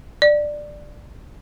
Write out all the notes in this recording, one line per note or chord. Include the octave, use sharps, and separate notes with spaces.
D5